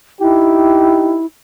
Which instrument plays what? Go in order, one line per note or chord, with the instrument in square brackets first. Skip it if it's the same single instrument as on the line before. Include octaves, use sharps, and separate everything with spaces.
[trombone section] D#4 G4 [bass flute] E4